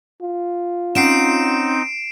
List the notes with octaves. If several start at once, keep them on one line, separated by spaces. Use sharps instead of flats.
F4
C4 C#4 D#4 F#5 C7 D7 E7